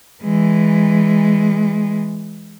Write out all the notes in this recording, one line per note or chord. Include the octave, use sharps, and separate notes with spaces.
E3 G#3